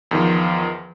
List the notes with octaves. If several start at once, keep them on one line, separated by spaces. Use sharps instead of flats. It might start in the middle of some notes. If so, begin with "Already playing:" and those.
E2 D#3 F3